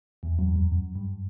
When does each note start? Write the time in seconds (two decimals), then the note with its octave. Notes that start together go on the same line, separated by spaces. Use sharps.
0.23 E2
0.39 F#2
0.56 F#2
0.72 F#2
0.95 G2